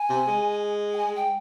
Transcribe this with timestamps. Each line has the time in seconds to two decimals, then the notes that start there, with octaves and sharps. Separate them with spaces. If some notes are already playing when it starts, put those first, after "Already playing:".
Already playing: G#5
0.09 C3
0.27 G#3
0.94 G5
0.97 G#5
1.16 G5